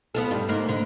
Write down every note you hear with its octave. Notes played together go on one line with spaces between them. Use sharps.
B3 F4 A4
G2 G3
G#2 A#3
D3